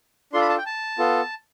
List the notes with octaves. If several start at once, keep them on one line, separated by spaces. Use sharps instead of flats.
D4 F4 A4 C6
B5
A5
G5
A5
B3 F4 A4